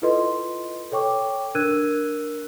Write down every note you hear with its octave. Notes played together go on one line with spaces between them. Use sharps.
E4 F4 A4 B4 D#5 C6
A4 C#5 G5 C#6 D6
D4 A#4 E6 F#6 G#6 D#7